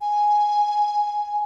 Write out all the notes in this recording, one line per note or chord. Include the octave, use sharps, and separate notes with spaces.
G#5